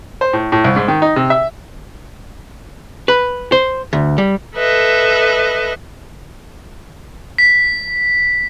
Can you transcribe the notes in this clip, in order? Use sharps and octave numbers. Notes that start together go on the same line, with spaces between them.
C5
A2
A2
C2
G#2
D#3
D#4
C3
E5
B4
C5
D2
G3
A4 B4 D#5 E5
B6